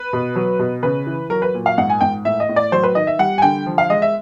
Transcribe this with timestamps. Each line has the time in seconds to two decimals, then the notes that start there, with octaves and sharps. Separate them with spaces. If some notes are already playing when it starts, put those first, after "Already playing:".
Already playing: B4
0.13 B2
0.36 F#3
0.59 B2
0.83 C#3 B4
1.07 E3
1.30 F#3 A#4
1.42 B4
1.54 A#2
1.66 F5
1.78 G#2 F#5
1.90 G#5
2.01 G#2 G5
2.25 A2 E5
2.40 D#5
2.49 A2
2.56 D5
2.72 F#3 C5
2.83 B4
2.95 D#3 D#5
3.07 E5
3.19 G3 F#5
3.38 G#5
3.42 D3 G5
3.66 F3
3.78 F5
3.90 G#3 D#5
4.02 E5